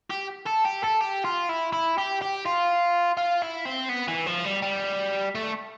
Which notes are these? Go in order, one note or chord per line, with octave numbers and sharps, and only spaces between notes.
G4
A4
G4
A4
G4
F4
E4
E4
G4
G4
F4
F4
E4
C4
B3
E3
F3
G3
G3
A3